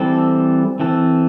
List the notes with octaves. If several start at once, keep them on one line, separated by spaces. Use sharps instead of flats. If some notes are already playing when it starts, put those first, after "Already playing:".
Already playing: E3 G3 C4 A4
E3 C4 A4